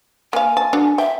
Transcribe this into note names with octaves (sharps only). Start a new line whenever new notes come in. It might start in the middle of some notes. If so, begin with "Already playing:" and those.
A#3 F5 G#5
A5
D4 F#4 A4
E5 G5